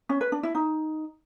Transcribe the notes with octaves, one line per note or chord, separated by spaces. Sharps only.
C#4
B4
D4
E4
D#4